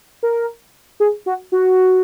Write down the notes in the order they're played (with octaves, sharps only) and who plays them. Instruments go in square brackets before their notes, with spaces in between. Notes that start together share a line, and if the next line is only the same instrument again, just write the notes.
[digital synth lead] A#4
G#4
F#4
F#4